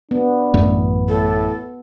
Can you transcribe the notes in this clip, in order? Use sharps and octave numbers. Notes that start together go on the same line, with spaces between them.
B3 D4
A1 F#2 A3
A2 A4